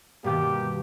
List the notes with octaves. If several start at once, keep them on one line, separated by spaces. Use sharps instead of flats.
G2 B2 D#3 A#3 G4